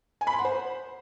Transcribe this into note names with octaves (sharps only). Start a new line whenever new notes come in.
G#5
B5
C6
F#5
C5